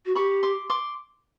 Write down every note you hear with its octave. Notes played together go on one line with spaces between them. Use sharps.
F#4
G4 B5 C#6
C6 D6
C6 D6